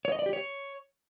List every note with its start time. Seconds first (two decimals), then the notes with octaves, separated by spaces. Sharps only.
0.05 C#5
0.12 D#5
0.19 D5
0.26 G4
0.33 C#5